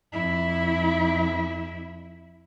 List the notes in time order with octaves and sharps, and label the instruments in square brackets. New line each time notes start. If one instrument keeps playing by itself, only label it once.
[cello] F2 E4